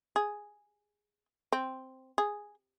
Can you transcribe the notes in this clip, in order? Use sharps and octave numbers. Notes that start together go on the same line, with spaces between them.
G#4
C4
G#4